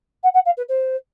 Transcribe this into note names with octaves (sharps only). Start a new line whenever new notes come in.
F#5
F#5
F5
B4
C5